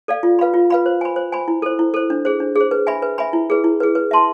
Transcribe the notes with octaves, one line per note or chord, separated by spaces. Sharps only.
A4 D5 F5
F4
B4 F5 B5
F4
B4 F5 B5
C5
G#5 B5
C5
G#5 B5
E4
A4 C5
E4
A4 C5
D4
G#4 C5
D4
G#4 C5
B4
E5 G#5 B5
B4
E5 G#5 B5
E4
G#4 B4
E4
G#4 B4
B4
E5 A5 C6